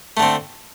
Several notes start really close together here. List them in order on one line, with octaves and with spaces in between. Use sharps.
A3 D3 C4